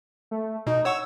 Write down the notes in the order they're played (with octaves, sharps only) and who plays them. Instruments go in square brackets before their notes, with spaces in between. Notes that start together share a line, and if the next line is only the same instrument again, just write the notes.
[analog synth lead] A3
[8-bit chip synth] B2 [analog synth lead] D#4
[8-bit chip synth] C#5 F#5 C#6 [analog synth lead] E6